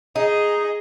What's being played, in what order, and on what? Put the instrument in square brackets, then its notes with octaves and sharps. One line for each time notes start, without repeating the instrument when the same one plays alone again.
[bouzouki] D#4 [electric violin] G#4 D#5